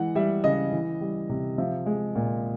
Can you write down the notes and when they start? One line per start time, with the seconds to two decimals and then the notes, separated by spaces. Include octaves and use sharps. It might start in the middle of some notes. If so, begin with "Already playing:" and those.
Already playing: E3 G#3 F#5
0.15 G3 E5
0.44 C#3 D#5
0.72 E3
1.01 G3
1.29 C3
1.58 F3 E5
1.86 G#3
2.16 A#2